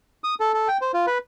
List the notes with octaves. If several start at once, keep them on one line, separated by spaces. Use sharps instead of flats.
D#6
A4
A4
G5
C5
F4
B4